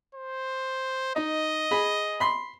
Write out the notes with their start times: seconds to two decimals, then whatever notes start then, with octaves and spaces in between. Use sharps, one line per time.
0.15 C5
1.16 D#4 D#5
1.71 G#4 B5
2.20 B5 C6